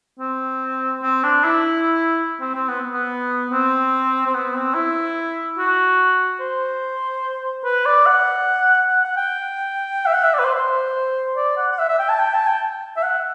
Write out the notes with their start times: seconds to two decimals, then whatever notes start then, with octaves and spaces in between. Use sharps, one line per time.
0.19 C4
1.02 C4
1.23 D4
1.44 E4
2.40 C4
2.54 C4
2.68 B3
2.90 B3
3.51 C4
4.26 C4
4.34 B3
4.54 C4
4.74 E4
5.58 F#4
6.40 C5
7.64 B4
7.86 D5
8.06 F#5
8.88 F#5
9.04 F#5
9.16 G5
10.06 E5
10.13 F#5
10.23 E5
10.34 D5
10.39 B4
10.44 C5
10.55 C5
11.36 D5
11.57 F#5
11.71 F#5
11.79 E5
11.89 E5
11.99 G5
12.09 A5
12.19 G5
12.34 A5
12.47 G5
12.96 E5
13.03 F#5